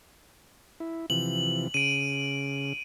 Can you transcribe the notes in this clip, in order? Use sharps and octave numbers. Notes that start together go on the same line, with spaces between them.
E4
C3 E3 F3 F#7
C#3 D7 D#7